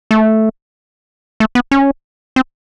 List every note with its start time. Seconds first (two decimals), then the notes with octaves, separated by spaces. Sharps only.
0.11 A3
1.40 A3
1.55 B3
1.71 C#4
2.36 C4